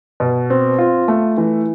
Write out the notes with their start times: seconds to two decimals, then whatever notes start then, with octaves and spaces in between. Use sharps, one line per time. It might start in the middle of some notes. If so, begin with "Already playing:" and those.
0.20 B2
0.50 C4
0.79 F4
1.08 A3
1.38 E3